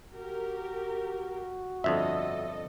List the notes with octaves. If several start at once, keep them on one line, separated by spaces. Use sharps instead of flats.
F#4 G4 A#4
G1 F2 D4 A4 D#5 E5